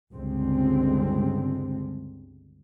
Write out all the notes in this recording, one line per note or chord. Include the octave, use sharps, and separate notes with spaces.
G1 C#2 D3 G3 G#3 C4